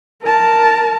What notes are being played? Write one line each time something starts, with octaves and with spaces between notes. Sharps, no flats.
A#4 A5